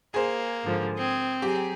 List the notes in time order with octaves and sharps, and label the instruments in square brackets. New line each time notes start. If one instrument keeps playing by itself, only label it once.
[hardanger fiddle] A#3 [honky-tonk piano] G#4 C5
[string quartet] G#2 D3 F3
[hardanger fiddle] C4 [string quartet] D#6 G#6
[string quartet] F#3 G#4 A#5 [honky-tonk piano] G4